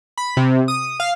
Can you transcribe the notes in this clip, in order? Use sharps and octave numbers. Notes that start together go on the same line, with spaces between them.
B5
C3
D#6
F5